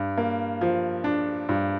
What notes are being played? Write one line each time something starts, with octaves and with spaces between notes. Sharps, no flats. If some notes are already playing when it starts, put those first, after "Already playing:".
Already playing: G2
A#3
F3
D4
G2